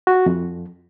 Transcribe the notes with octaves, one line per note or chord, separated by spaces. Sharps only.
F#4
F2